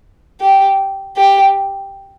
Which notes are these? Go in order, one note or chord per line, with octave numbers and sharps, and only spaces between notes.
G4
G4